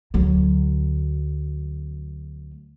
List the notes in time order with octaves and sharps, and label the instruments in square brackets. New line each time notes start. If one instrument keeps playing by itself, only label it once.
[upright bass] D2 F#3